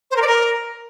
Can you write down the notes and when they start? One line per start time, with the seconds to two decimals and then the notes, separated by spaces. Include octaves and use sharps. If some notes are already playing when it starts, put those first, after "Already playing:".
0.11 C5
0.16 A#4
0.22 D5
0.27 A#4